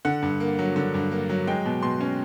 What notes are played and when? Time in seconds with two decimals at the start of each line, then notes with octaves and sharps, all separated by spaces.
0.05 D3 F#5
0.22 G2
0.40 A#3
0.59 F#3
0.76 D3
0.94 G2
1.11 A#3
1.29 F#3
1.47 G#3 G5
1.65 B2
1.82 B2 C6
2.00 C#4